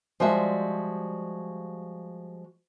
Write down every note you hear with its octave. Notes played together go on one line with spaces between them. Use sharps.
F3 G3 G#3 F#4 D5 E5